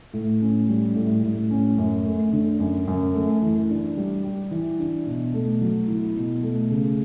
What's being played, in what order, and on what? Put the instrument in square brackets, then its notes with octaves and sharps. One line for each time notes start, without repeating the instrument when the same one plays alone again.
[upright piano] A2
C#4
G3
A2
A2
C#4
F#2
A3
D3
F#2
F#2
A3
E3
D4
G3
G4
E3
D4
B2
A3
F#3
E4
B2
A3
C#3